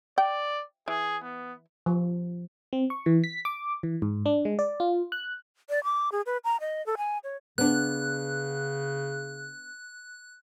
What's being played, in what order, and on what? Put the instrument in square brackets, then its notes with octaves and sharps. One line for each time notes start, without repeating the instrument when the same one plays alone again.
[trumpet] D5 [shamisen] G5
[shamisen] E3 [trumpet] G#4
[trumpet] B3
[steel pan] F3
[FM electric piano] C4
C#6
E3
B6
D6
E3
G#2
D4
G#3
D5
F4
F#6
[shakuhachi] D5
D6
G#4
B4
A#5
D#5
A4
G#5
C#5
[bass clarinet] C#3 [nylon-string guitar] B3 D4 [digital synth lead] F#6